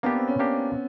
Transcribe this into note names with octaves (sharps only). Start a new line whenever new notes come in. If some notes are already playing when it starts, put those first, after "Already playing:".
A#3 B3 D4 G4
C4
C#4
A#3 D4 G4